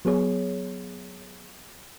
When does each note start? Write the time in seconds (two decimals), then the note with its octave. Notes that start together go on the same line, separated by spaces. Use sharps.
0.05 F#3 B3 G#4 C#5